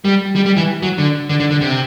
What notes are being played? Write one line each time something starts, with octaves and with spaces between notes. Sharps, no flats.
G3
G3
G3
E3
F#3
D3
D3
D3
D3
C3